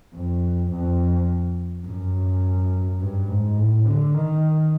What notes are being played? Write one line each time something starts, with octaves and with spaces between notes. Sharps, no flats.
F2
F2
F#2
G2
G#2
A2
D3
D#3